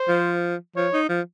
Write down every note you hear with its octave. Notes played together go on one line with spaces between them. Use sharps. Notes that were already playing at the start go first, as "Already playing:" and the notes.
Already playing: C5
F3
F3 C#5
D#4
F3